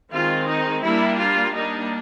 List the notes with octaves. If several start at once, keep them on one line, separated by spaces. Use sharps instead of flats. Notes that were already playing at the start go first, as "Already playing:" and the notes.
D#3 G#3 C4 F4
D#4
G3 A#3 D4 E4
F4
G3 A#3 D4 D#4